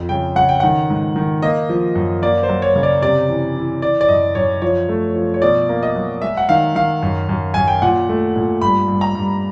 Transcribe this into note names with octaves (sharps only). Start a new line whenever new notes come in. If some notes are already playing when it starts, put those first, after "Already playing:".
Already playing: F2
C#3 G5
C#3 F#5
G5
D#3 F#5
G#2
D#3
A#3 D#5
F3
F#2
A#3 D5
C5
F#3
C#5
C#3
D5
C3 D5
E3
E3
E3 D5
D5
F#2 D#5
F#2 C#5
F3 C#5
A3
F3
C#5
B2 D5
A#3
D#5
F#3
G#3 E5
F#5
D#3 F5
D#3 F5
F#2
F#2
F#2 G#5
G5
A#2 F#5
A3
A#2
G2 B5
G2
A#5
G2